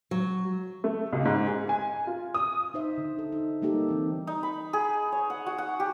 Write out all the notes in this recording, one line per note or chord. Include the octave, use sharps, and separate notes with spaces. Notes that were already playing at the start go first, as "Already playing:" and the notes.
F#3
A3
C#2
G#2
G#4
G#5
F4
D#6
D#4 C5 E5
D3
A4
D#4
G3 A#3 D#4 G4 A4
E3 C4
D#4
B5
G#4
C#5
F#5
F#4
F#5
G4